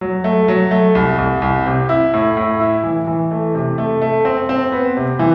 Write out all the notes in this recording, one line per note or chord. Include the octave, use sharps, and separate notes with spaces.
F#3
A3
F#3
A3
C2
C2
C2
C3
E4
A2
A2
E4
E3
E3
A3
C3
A3
A3
C4
C4
B3
C3
E3